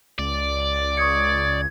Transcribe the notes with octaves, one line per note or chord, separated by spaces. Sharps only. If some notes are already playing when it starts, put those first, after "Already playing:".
C#2 D5
C#6 D#6 G#6 C#7